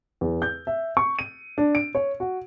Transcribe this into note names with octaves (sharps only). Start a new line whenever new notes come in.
E2
G6
E5
C#6
D#7
D4
D7
C#5
F#4